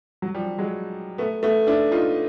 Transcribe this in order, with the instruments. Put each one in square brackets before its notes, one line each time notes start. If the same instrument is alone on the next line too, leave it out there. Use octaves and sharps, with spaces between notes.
[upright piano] F#3
F3 G3
F#3 G#3
A3 B3
A3 B3
D4 E4
D#4 F4